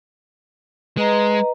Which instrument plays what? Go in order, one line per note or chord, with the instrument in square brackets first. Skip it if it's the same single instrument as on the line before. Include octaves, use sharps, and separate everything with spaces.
[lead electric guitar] G#3 [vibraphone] B4 D#5 A#5